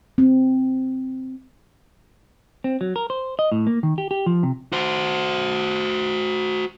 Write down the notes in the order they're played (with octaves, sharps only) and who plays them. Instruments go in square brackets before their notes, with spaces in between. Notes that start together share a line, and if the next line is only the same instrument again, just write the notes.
[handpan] C4
[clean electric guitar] C4
F#3
A#4
C5
D#5
A2
A#3
D#3
G4
G4
F3
C3
[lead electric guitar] F#4 C5